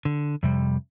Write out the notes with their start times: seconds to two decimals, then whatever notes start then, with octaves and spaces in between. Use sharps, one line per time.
0.05 D3
0.43 F2 C3 G3